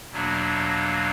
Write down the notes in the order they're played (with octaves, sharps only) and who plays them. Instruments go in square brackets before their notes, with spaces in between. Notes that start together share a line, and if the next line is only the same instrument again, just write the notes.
[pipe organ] E2 B2 F#3 A#3 D4